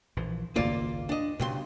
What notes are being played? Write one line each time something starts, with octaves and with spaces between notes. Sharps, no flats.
A#1 E3 F3
G#1 C#2 F#2 A#3 F4 D5
D4 D#5
C#2 G2 B2 B3 C6